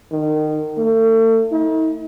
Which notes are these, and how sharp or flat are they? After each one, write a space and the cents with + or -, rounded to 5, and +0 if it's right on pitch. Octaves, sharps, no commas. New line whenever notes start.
D#3 -25
A3 +40
D#4 +45